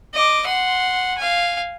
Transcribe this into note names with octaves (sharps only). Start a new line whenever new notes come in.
D#5 D6
F#5 C6
F5 G#5